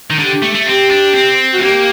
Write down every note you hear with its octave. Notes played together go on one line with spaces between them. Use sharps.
D#3
D3 G4
A3
A3
C4 G4
D4
C4
F#4
A3
A#3 G4